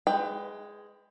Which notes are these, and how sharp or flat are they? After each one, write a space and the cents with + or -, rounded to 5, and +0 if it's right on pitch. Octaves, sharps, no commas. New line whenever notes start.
G#3 +0 B4 +25 G5 +15